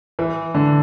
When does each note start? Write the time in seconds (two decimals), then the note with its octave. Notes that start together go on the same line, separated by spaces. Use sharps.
0.19 E3
0.55 D3